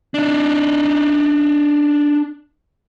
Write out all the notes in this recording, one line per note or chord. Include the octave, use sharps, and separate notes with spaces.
D4 D#4